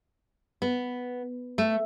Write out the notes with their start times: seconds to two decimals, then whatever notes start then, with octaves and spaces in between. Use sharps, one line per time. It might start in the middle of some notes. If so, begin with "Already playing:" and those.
0.62 B3
1.58 A3